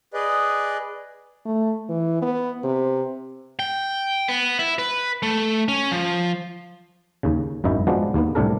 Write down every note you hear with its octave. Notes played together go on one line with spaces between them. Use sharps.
G#4 B4 D5 D#5
A3
E3
B3
C3
G5
B3
E4
B4
A3
C#4
F3
D#2 C#3
G#1 F#2 D#4 E4
F3 G#3 B3 D4 F#4
D#2 A#3 B3
C2 A2 C3 D4 A4 A#4